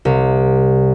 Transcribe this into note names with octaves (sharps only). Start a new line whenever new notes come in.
C2